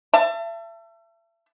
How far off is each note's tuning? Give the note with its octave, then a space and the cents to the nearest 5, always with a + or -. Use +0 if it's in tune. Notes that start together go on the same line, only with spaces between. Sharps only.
E5 +35 A5 +25